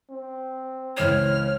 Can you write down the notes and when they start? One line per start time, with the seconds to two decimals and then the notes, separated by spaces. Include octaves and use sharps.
0.10 C4
0.97 C#2 E3 C#5 F6 C7